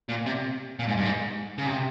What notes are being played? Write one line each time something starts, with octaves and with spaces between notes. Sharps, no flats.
A#2
C3
A#2
G#2
G2
G#2
C#3
C3